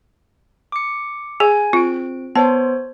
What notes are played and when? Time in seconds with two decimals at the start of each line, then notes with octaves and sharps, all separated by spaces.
0.72 D6 C#7
1.40 G#4 G#5
1.73 C4 F4 D7
2.35 B3 C5 C#5 A5